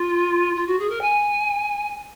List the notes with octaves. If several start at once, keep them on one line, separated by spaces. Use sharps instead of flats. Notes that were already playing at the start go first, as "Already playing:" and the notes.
Already playing: F4
F4
F#4
G#4
A#4
G#5